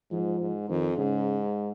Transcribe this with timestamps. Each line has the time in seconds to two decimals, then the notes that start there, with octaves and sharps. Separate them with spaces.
0.11 G#2 F3
0.40 G#2
0.69 F2 D#3
0.97 G#2 C#3